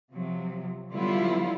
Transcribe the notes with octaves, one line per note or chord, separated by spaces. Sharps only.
C3 F3 F#3
D3 F#3 G3 B3 E4 F4